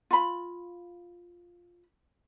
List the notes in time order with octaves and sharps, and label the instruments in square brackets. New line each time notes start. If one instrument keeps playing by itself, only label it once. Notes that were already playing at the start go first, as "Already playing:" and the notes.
[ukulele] F4 B5